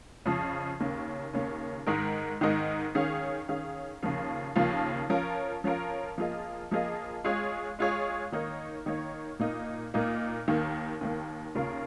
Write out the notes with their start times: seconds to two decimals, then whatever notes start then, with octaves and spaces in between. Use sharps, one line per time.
0.26 F2 C#3 F3
0.80 D#2 C#3 A#3 C#4
1.33 D#2 C#3 A#3 C#4
1.87 G#2 D#3 G#3 D#4 A#4
2.41 G#2 D#3 G#3 D#4 A#4
2.95 D#3 C#4 G#4 F5
3.48 D#3 C#4 G#4 F5
4.03 D#2 C#3 F3 A#3 F4
4.56 D#2 C#3 F3 A#3 F4
5.10 F3 C#4 F4 A#4
5.64 F3 C#4 F4 A#4
6.18 F3 A#3 F4 G#4 D#5
6.71 F3 A#3 F4 G#4 D#5
7.24 G#3 F4 G#4 C#5
7.79 G#3 F4 G#4 C#5
8.32 D#3 A#3 D#4 C#5
8.86 D#3 A#3 D#4 C#5
9.39 A#2 A#3 D#4
9.94 A#2 A#3 D#4
10.48 D#2 D#3 A#3
11.01 D#2 D#3 A#3
11.54 D#2 C#3 A#3 F4 A#4